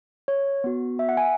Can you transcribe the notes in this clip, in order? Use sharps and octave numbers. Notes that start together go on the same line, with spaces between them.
C#5
B3 F#4
E5
F#5
G#5